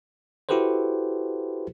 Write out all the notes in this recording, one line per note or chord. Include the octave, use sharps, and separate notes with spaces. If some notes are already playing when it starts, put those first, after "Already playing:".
E4 F#4 G4 A4 B4 C5